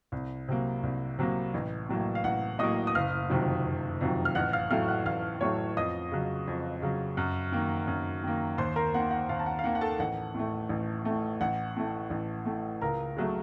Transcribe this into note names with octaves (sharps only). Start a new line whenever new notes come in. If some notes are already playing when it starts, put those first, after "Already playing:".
C2
C3 F#3 A#3
C2
C3 F#3 A#3
A1
A2 F#3 A#3
F5
A1 F#5
A2 F#3 A#3 D#5 D#6
D#6
F#1 F5 F6
F2 C3 D#3 F#3
F#1
F2 C3 D#3 F#3
F6
A1 F#5 F#6
F5 F6
A2 F#3 A3 F5 F6
F#5 F#6
A1 F5 F6
A2 F#3 A3 C#5 C#6
F2 D#5 D#6
C#3 F#3
F2
C#3 F#3
F#2
D#3 A#3
F#2
D#3 A#3
D#2 C5 C6
A#4 A#5
D#3 A#3 F#5
F#5
D#2 F5
A5
F#5
F5
D#3 A#3 F#5
F#5
A4 A5
A1 F#5
A2 A3
A1
A2 A3
A1 F#5
A2 A3
A1
A2 A3
C#2 A#4 A#5
C#3 F#3 A3